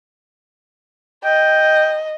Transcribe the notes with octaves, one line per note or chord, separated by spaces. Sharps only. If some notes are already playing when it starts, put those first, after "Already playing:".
D#5 G5